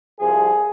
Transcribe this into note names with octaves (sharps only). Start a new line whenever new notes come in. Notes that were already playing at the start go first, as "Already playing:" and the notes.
C2 C3 F3 G#4